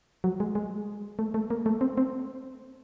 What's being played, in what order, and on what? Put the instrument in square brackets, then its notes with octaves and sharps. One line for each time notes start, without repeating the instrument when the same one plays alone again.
[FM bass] F#3
G#3
G#3
A3
A3
A#3
A3
C4
C4